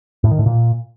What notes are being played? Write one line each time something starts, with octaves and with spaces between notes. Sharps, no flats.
A2
D#3
A2
A#2